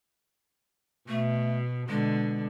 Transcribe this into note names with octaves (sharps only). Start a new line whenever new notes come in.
B2 A3
B2 D3 G#3